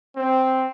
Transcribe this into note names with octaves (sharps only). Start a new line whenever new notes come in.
C4